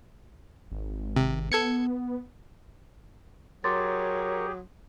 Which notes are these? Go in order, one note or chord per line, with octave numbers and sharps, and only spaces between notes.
G#1
C3
B3 A4 G#6 C#7
F#3 G4 G#4 A#4 C#5 C6 D6 A6